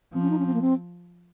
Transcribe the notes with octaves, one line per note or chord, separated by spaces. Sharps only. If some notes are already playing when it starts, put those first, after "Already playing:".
F3 C4
C#4
D#4
C#4
C4
A#3
C4